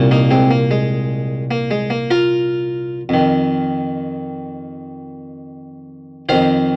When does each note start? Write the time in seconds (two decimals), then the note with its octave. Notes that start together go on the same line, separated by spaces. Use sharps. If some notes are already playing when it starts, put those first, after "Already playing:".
Already playing: C2 A#2
0.11 A#3 D#4
0.31 G#3 C4
0.51 A#3
0.71 G#3
1.51 A#3
1.71 G#3
1.90 A#3
2.11 F4 A#4
3.09 F2 D#3
6.29 F2 D#3 C5 F5